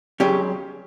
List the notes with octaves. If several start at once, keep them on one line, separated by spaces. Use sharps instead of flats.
C#2 C#3 F#3 C#4 G4